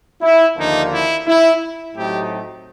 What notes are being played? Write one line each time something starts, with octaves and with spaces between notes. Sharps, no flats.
E4
D#2 D3 F3 A#3 D4 D#4
E4
E4
A2 F#3 A3 C4 D#4 G4